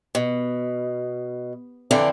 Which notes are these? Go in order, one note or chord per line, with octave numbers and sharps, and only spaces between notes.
B2
F2 D3 E3 D4